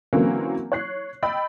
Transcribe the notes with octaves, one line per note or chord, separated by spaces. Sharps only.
D3 E3 F#3 A#3 C4 C#4
C#5 F#6 C7
D#5 G5 B5 E6 A6